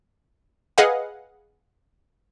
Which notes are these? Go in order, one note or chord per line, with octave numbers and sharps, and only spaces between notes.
G#4 B4 D#5 F5 F#5